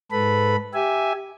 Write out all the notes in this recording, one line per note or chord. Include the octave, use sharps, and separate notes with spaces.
G#2 A4 B4 B5
G4 E5 G#5